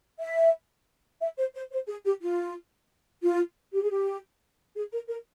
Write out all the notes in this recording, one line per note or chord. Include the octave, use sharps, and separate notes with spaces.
E5
E5
C5
C5
C5
G#4
G4
F4
F4
G4
G#4
G4
G#4
A#4
A#4